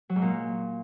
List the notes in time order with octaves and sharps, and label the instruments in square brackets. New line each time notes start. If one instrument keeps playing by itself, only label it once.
[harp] F#3
G#2
A#2